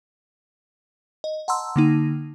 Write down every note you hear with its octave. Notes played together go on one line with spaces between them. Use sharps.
D#5
F#5 A5 A#5 C6 E6
D3 A#3 D#4